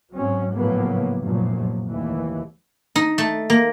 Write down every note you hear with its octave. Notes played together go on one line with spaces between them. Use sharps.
G#2 F#3 C4 C#4
A2 C#3 F3 F#3 A#3 B3
F1 F#2 A#2 F3 F#3
F1 D#2 E3
D#4
A3
A#3